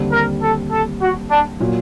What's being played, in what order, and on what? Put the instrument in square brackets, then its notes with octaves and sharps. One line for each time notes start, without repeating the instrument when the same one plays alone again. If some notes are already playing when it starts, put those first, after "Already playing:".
Already playing: [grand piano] D#2 D3 G3 C4
[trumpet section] A#4
A4
A4
F#4
D4
[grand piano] A#2 F#3